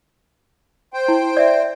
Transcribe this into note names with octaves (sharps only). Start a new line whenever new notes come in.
C5 G5
E4
D5 E5